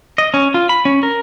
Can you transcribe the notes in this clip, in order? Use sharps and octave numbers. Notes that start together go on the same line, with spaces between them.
D#5
C#4
F4
B5
C#4
A#4